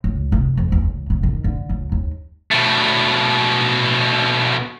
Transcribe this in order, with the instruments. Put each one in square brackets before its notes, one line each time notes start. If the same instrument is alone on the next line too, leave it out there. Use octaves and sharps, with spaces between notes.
[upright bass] C#2
F1
F2
E2
C#2
C#3
D#3
D3
C#2
D#2
[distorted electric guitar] B2 A3